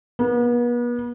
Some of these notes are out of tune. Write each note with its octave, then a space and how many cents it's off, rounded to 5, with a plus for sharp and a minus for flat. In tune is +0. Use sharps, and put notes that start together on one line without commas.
B3 -40